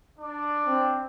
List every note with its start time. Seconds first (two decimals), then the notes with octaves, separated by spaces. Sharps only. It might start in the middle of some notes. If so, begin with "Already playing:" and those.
0.19 D4 D5
0.67 C4